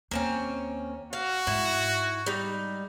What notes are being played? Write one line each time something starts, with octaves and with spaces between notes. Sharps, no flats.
D#2 A#3 C4 C#4
F#4 F5
G#2 E4
G3 D#4